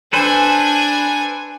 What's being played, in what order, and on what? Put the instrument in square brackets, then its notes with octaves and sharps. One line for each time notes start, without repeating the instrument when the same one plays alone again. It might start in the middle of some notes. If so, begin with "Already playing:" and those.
[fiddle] D4 G#5 [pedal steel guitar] A4 B4 C5